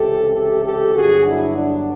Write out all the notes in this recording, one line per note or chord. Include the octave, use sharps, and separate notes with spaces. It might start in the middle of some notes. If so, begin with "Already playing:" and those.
Already playing: C#2 C3 E3 G4 A4
G4 A4
G4 A4
G2 D3 F#3 B3 F#4 G#4
D4 E4
D4